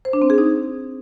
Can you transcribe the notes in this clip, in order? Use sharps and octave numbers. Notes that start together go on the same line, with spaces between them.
C5
D4
C4
G#4
D#4